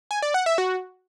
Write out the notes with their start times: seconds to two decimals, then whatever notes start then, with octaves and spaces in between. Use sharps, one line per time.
0.11 G#5
0.22 D5
0.34 F#5
0.46 E5
0.58 F#4